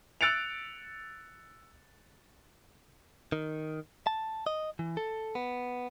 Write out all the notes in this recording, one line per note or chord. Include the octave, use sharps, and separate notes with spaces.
E6 F#6 A6 C#7 D7 F7
D#3
A5
D#5
E3
A4
B3